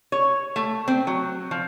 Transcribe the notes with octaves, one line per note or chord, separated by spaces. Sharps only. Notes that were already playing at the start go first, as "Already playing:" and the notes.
C#5
A3
C4
F#3
F3